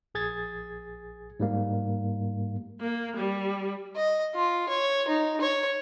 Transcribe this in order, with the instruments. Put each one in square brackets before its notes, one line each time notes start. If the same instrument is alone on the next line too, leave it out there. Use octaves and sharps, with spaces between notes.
[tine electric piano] A#1 G#4 G#6 A6
G#2 G3 A#3
[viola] A#3
G3
[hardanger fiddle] D#5
F4
C#5
D#4
C#5